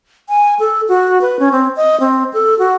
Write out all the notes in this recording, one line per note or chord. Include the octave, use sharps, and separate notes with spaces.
G#5
A4
F#4
B4
C#4
C4
D#5
C4
A4
F#4